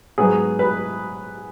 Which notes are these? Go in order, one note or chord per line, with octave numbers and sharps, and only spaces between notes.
G#2 F#3 B3 G#4
B4